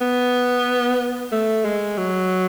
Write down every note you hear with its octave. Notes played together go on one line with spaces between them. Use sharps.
B3
A3
G#3
F#3